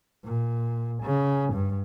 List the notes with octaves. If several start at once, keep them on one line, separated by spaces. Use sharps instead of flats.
A#2
C#3
G2